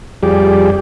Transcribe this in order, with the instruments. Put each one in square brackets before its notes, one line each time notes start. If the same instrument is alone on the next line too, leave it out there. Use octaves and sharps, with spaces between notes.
[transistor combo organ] F2 G3 G4 G#4 D5